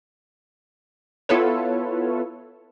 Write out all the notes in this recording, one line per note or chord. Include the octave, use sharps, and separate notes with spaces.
B3 E4 F4 A4 B4 C#5